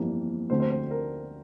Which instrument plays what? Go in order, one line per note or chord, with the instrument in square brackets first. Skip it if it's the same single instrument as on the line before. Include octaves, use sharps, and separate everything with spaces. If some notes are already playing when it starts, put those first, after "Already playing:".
Already playing: [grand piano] G1 F2 E3 G3 A#3
D2 D3 A3 C4 C5
C5
C5
A#4